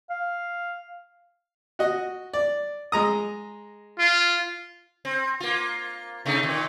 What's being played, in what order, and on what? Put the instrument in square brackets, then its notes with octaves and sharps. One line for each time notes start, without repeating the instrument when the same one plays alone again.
[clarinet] F5
[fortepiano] F#4 D#5
D5
G#3 A#5 D#6
[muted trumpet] F4
[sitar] C4
A#3 F4
C3 A3 D#4
A#2 D#3